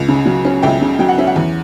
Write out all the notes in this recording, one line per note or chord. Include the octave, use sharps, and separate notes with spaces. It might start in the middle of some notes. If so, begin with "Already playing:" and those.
Already playing: C#2
C#3
F#3
C#4
C#2 E5 G5
C#3
F#3 G5
F#5
C#4 E5
F#5
E2